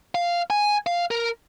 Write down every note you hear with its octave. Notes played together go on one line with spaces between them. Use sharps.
F5
G#5
F5
A#4